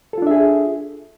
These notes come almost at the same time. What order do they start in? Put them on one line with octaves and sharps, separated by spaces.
A4 F4 D4 E5 G#4